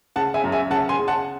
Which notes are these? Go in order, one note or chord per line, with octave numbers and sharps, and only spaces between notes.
C#3 F#5 A5
E5 G#5
F#2
E5 G#5
C#3 F#5 A5
G#5 C6
C#3
F#5 A5